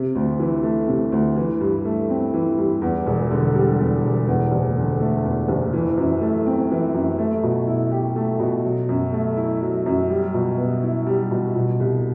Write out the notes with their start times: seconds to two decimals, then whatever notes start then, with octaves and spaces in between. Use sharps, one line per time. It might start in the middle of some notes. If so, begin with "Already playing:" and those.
Already playing: C3
0.15 D2
0.39 E3
0.63 A3
0.88 C3
1.12 D2
1.36 E3
1.60 G2
1.85 A3
2.10 C4
2.34 E3
2.58 G2
2.82 E2
3.06 E1
3.31 D3
3.55 G3
3.80 E2
4.04 E1
4.28 E2
4.52 F#1
4.76 D3
5.01 A3
5.24 E2
5.48 F#1
5.73 E3
5.98 F#2
6.21 A3
6.46 C4
6.71 E3
6.94 F#2
7.19 A3
7.43 B2
7.67 E4
7.92 G4
8.16 A3
8.40 B2
8.65 F#3
8.89 F#2
9.13 A3
9.37 E4
9.62 F#3
9.86 F#2
10.10 G3
10.34 B2
10.58 B3
10.83 E4
11.07 G3
11.31 B2
11.55 B2
11.80 C2